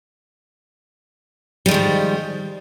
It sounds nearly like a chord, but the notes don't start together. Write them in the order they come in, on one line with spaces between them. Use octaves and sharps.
G3 G#3 D#3 F3